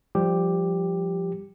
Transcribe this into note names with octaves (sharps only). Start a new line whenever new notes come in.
F3 G3 G4